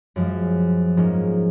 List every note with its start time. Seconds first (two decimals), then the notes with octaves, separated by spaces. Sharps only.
0.16 F#2 F3 G#3
0.97 G#2 F3 A#3 C#4